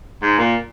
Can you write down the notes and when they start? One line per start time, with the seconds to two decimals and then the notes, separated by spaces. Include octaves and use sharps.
0.22 G#2
0.38 A#2